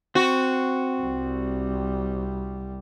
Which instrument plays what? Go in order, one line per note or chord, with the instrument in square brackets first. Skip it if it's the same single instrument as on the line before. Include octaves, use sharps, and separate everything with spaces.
[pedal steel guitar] C4 [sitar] F#4
[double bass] C2 G3